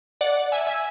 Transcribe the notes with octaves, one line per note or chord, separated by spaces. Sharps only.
D5 F#5
E5 G#5
E5 G#5